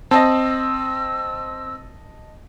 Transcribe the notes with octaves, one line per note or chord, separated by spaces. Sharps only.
C4 D#5 A5 E6